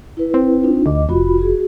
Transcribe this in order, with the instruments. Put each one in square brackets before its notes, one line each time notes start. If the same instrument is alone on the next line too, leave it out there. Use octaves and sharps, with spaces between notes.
[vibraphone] E4 B4
[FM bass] C4
[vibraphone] D4 D#4 F4
[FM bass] D2 [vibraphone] D#5 D6
[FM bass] F1 [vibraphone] F4 F#4 B5
[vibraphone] F#4 G#4